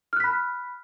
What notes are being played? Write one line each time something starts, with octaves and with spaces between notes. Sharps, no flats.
B5 F6 F#6 B6